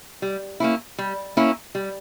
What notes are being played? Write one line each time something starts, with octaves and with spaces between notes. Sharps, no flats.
G3
A#3 C#4 E4
G3
A#3 C#4 E4
G3